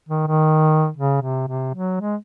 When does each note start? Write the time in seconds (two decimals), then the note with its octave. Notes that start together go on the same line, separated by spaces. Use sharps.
0.09 D#3
0.27 D#3
0.97 C#3
1.22 C3
1.48 C3
1.75 F#3
2.00 G#3